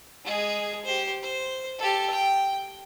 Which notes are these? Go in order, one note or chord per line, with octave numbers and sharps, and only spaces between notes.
G#3 G#4
G4 C5
C5
G4 A4
G5